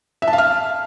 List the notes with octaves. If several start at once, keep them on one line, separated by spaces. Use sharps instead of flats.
E5
A5
F5
F6